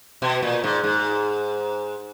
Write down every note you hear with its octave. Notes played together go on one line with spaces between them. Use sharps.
B2
A#2
G#2
G#2